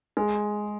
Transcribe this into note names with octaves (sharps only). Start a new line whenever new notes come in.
G#3